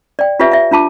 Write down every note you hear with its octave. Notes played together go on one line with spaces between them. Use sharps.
D5 G5
F4 G4 B4 C#5 E5 G#5
E5 F5
D4 F4 A5 D6